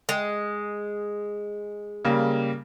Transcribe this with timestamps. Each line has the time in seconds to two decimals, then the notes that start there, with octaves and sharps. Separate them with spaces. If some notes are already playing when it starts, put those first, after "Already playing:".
0.09 G#3
2.05 C#3 G3 A#3